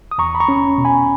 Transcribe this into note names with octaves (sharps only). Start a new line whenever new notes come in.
D#6
E2 A#5 C#6
B5
A#5 C#6
C#4
B2
G#5 B5